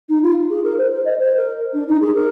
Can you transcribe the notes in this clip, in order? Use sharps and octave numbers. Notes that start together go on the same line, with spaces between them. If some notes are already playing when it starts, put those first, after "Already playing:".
D#4
F4
G#4
A#4
C5
C5
D#5
C5
A#4
D4
D#4
G#4
A#4